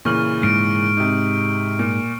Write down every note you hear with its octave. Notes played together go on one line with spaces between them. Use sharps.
A#2 C#3 E3 C#6 F6 F#7
G#2 F6 D7
C3 D#4
A#2